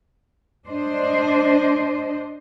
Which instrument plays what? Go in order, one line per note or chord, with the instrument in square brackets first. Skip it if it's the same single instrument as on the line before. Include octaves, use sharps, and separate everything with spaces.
[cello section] D4 C5 D#5